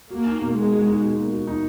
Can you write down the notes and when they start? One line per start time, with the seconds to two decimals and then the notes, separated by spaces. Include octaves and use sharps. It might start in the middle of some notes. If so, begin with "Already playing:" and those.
0.10 A#3 F#4
0.27 D#4
0.41 B2
0.56 G#3 A#3
0.72 F#4
0.87 D#4
1.02 B2
1.17 A#3
1.32 F#4
1.47 D#4